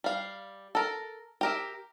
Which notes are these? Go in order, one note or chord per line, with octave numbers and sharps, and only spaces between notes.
G3 F5
A4 A#4
G4 A#4 E5